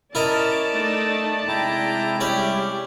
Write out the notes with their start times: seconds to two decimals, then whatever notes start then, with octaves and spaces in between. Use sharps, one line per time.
0.15 C#4 E4 A#4 D5 D#5 A5
0.72 A3 D#4
1.48 C3 G#3 E4 G5 A#5
2.21 G3 C#4 E4 G4 D5 G5